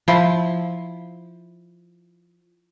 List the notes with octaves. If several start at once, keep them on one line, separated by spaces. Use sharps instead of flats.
F3 E4